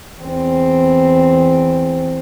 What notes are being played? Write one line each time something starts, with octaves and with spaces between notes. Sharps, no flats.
E2 C4